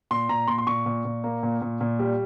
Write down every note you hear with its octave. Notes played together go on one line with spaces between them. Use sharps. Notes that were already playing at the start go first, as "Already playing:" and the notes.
A#2 C6
A#2 A#5
A#2 C6
C6
A#2 C#6
A#2
A#2
A#3
A#2
A#2
A#2
G3